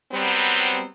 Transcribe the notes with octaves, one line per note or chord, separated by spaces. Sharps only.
F#3 G3 B3 C4